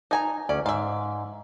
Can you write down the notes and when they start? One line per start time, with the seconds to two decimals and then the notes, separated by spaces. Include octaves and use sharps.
0.11 D4 D#4 G#5 A#5
0.49 D2 C#4 D5
0.66 G#2 E5 F5